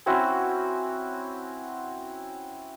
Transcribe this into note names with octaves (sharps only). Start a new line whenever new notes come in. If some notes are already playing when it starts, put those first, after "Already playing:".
C4 C#4 E4 F#4